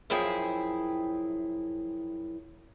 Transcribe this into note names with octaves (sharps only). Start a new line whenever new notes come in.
F#2 F3 E4 G#4 G5